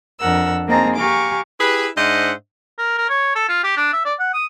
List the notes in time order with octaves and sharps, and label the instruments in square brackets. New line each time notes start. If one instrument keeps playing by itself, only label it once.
[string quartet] F2 D4 A#4 F#5 E6
A#3 C4 D#4 G#4 A5 A#5
G4 F5 G#5 A#5 C#6 D6
[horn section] E4 G4 G#4 B4
G#2 D4 C5 D#5 E5 F#5
[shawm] A#4
A#4
C#5
A4
F4
G4
D4
E5
D5
F#5
D#6